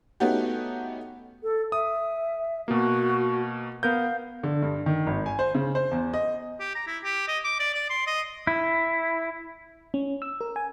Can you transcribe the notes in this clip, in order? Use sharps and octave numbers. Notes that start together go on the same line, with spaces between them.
A3 B3 C#4 D#4 F#4 G4
A4
E5 D#6
B2 A#3 F#4
B3 A#4 F5 G6
D3
G2
D#3
G#1
G#5
C5
C#3
C5
E2
D#5
G4
A#5
E4
G4
D#5
D6
D5
D5
C6
D#5
E4
C#4
E6
A#4
G#5